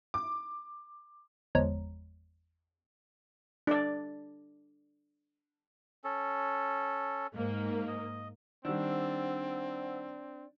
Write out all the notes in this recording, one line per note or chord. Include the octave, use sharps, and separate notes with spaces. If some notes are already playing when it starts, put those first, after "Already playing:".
D6
G1 E2 F3 G#3 C#5 A#5
D4 D5
C#4 A4
G#2 A#3
D#5
D#3 G3 C4 D4 C5 F#5 E6